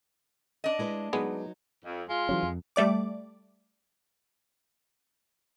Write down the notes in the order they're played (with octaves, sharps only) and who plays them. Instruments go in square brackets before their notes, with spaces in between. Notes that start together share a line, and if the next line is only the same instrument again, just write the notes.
[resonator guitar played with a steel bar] D4 D#5
[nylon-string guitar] G#3 E4 B4
[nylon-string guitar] F#3 D#4 B4 [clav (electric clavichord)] G#3 B3 G#4
[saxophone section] F2
G#3 F4
[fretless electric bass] E3 F#3 C#4
F2
[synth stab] G3 A3 D5 D6